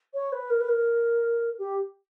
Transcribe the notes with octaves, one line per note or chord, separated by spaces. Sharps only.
C#5
B4
A#4
B4
A#4
G4